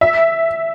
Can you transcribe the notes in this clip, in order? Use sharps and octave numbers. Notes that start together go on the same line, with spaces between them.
E5